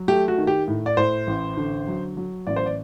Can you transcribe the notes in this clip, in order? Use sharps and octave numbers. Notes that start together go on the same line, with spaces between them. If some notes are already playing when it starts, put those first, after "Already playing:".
Already playing: F#3
A3 G4
F#4
D#3
G4
A2
D5
A2 C5
A1
D3
F#3
F#3
A1 D5
C5
D5